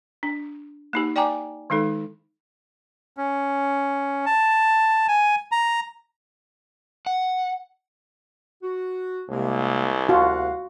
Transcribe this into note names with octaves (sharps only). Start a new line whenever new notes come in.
D4
A#3 D#4 G4
D5 G5 G#5 A#5 D6
D#3 G#3 D#4 A4
C#4
A5
G#5
A#5
F#5
F#4
C2 C3 G#3 A#3
D2 F4 F#4 F5 F#5